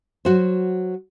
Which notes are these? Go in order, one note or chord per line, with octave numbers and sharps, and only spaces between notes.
F#3 F#4 C5